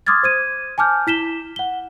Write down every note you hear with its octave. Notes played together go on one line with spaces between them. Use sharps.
C6 D6 D#6 F6 G#6 A6
C5 G#6 D#7
G#5 A5 D6 F6 G6
E4 B6 E7 G7
F#5 G7